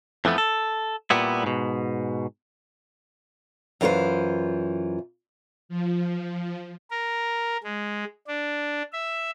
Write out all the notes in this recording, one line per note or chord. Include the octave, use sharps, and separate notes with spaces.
F2 E3 F3 A3 B3
A4
A#2 G3 B3 E4
G#2 B2
F#2 E3 F4 A#4 C5
F3
A#4
G#3
D4
E5